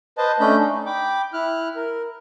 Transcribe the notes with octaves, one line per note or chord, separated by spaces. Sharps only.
B4 C5 D#5 A5
A3 C#4 D4 D#5 B5 G6
D#4
G5 B5 D6
E4 F6 F#6
A#4